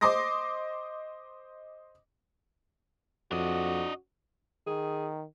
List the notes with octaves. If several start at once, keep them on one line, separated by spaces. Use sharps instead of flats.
C5 D#5 C6 D6 D#6 A#6
F2 D4 F#4 D#5
D#3 G#4